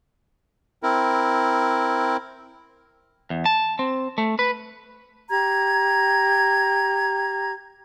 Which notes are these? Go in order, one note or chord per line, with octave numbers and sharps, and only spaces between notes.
C4 E4 A#4
E2
A5
C4
A3
B4
G4 A#5 G#6